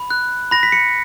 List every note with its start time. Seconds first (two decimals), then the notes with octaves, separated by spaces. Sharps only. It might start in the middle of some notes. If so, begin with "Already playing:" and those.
Already playing: B5
0.10 F#6
0.51 B5 A#6
0.63 B6
0.72 C#7